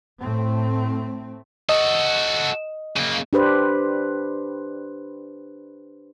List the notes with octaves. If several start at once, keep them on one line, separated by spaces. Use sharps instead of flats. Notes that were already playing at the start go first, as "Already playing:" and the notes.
A2 A3 C4
F#4 A4 D#5
C#3 A#3
D4 G4 B4 C5